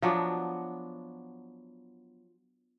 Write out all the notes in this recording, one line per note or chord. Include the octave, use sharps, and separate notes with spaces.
F3 F#3 B3 D4